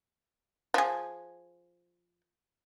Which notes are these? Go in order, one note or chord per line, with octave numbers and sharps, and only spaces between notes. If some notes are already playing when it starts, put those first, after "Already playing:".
F3 G#4